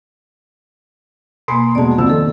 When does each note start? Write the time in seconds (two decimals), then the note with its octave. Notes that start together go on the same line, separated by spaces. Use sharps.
1.48 B2 A#3 G#5 B5 C6
1.75 E2 B2 G#3 D5 A5
1.98 C2 F3 E6
2.10 D#3 A4